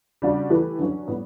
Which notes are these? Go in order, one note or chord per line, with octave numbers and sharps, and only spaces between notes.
C#3 G3 D4 F#4
E3 A3 E4 G4 B4
D3 F#3 C#4
A2 G3 B3